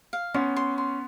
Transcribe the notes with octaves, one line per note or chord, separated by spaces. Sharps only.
F5
B3 C#4 C6
C6
C6